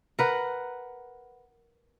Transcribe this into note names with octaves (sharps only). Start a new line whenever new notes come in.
A#4 B4 F#5